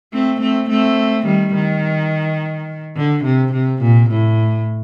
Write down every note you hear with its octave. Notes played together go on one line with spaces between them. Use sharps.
A3 C4
A3 C4
A3 C4
D#3 G3
D#3
D3
C3
C3
A#2
A2